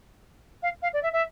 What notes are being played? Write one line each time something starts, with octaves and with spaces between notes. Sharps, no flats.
F5
F5
D5
E5
E5